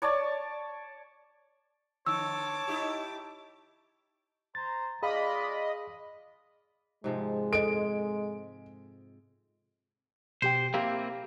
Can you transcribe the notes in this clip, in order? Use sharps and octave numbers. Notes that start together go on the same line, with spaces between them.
C#5 D5 A5
D3 C#5 A5 D6 E6
D#4 E4 G4
C5 A#5 A6
G#3 F4 G#4 D5 D#5 F5 B5
G#2 C3 F3 G#3
A4 D#5 D7
B2 G4 C5 G5
A#3 C4 E4 G4 F5